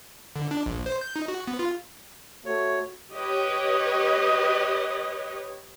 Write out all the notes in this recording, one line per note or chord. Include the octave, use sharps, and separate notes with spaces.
D3
D4
A#1
C5
G6
D#4
F#4
B3
F4
A3 F#4 C#5
G4 B4 C#5 D#5